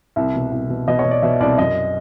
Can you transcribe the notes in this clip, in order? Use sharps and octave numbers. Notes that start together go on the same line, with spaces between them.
C2 E5
B2
C2
B2
B2 D#5
C#5
B2
D5
B2 E5
C2 D5
F#2 D#5